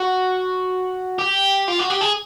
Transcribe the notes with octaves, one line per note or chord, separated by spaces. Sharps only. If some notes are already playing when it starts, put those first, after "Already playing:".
Already playing: F#4
G4
F4
F#4
G4
G#4